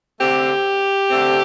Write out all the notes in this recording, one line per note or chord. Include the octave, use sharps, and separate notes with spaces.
D3 A3 C4 G4
D3 A3 C4